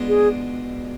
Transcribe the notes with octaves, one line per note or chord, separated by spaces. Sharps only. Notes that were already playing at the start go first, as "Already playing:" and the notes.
Already playing: B2 G#3 D4 F4
G#4